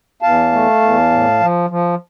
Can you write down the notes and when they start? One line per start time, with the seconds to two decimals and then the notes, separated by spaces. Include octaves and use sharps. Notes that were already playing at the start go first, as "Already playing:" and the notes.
0.22 E2 F5 A5
0.52 A3
0.82 E2
1.11 A2
1.40 F3
1.70 F3